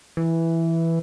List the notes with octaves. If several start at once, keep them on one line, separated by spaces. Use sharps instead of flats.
E3